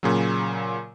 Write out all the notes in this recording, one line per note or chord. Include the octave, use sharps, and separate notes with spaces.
A#2 C#3 F#3